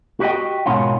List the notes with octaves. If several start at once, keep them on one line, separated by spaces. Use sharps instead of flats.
F#4 G4 C#5 D#5 G5
G#2 B2 D#3 C#4 F4